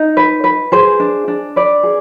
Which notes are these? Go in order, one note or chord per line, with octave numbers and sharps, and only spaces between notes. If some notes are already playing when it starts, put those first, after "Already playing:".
Already playing: D#4
B4
B4
G#4 C5
D4
D4
B4 D5
G#4